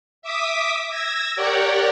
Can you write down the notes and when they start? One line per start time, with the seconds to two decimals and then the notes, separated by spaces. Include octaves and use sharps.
0.22 E5 D6 D#6 B6
0.89 E6 G#6 A#6
1.36 G4 A#4 C#5 D5 F#5 G5